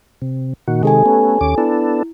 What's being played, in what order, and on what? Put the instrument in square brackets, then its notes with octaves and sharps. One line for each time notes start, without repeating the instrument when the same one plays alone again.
[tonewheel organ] C3
A#2 D#3 F#4
[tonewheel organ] C3 D#3 G#3 [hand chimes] G4 A4 G#5
[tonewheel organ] A3 B3 C#4
D#2 C#4 D6
[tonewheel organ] B3 D4 A4 [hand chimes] E4